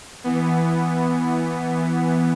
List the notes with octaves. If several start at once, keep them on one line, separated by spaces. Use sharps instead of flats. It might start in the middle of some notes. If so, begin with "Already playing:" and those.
E3 B3